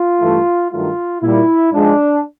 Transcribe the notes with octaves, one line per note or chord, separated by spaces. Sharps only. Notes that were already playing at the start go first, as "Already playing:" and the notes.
Already playing: F4
G2 E3 A3
G2 D#3 F#3 A3 F4
A#2 G3 E4
G#2 F3 G#3 D4